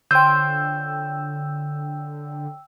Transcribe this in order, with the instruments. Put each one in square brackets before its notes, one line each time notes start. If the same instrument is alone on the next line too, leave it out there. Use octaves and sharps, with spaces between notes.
[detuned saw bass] D3 [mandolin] F4 C5 C#5 [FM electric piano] G5 E6 [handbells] G6